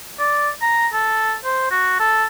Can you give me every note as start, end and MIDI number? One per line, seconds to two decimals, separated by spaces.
0.19 0.49 74
0.62 0.87 82
0.93 1.34 69
1.44 1.66 72
1.71 1.98 66
2.00 2.25 69